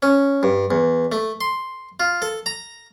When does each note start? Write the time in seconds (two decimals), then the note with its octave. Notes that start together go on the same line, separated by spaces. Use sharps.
0.03 C#4
0.43 G2
0.71 E2
1.12 A3
1.41 C6
2.00 F4
2.22 A4
2.46 A#5